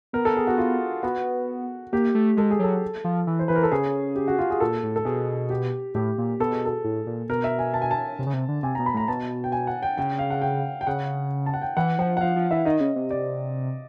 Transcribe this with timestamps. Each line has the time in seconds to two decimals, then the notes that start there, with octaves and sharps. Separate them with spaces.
0.13 B3 A#4
0.25 A4
0.37 G#4
0.47 F#4
0.58 F4
1.03 B3 F#4
1.93 A#3 G4
2.15 A3
2.37 G#3 A4
2.51 G#4
2.59 F#3 A4
3.04 F3
3.27 E3
3.39 C5
3.48 E3 B4
3.56 A#4
3.63 A4
3.72 C#3 G#4
4.16 G4
4.28 F#4
4.39 F4
4.50 G#4
4.60 A#2 A4
4.83 A2
4.96 A4
5.05 B2 G#4
5.50 G4
5.94 A2 G4
6.18 A#2
6.40 B2 A4
6.52 G#4
6.65 A4
6.84 A2
7.07 A#2
7.29 B2 A#4
7.44 E5
7.59 G#5
7.74 A5
7.82 G#5
7.91 A5
8.19 C3
8.27 C#3
8.34 C3
8.49 D3
8.63 C3 G#5
8.75 B2 A#5
8.86 B5
8.94 A2 A#5
9.08 B2 A5
9.44 G5
9.52 G#5
9.67 F#5
9.83 G5
9.97 C#3 G5
10.19 F5
10.30 F#5
10.42 G5
10.81 G5
10.87 C#3 F#5
11.46 A5
11.54 F#5
11.62 G5
11.77 E3 F#5
11.98 F3 F#5
12.17 F#5
12.21 F3 F5
12.36 F3
12.51 E3 E5
12.65 D#3 D#5
12.80 C#3
12.96 C3
13.11 D5